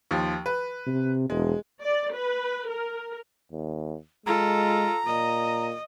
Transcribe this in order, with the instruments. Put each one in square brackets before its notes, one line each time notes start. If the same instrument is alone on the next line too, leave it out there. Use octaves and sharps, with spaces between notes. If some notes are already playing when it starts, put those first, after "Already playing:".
[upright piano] D#2 F3
B4
[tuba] C3
[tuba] E1 [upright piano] G#3
[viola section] D5
B4
A#4
[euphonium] D#2
[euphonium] G#3 [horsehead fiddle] F4 A4 [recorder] A#5
[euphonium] A#2 [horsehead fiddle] D#5